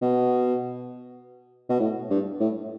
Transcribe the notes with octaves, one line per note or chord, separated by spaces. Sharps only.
B2
B2
A2
G2
A2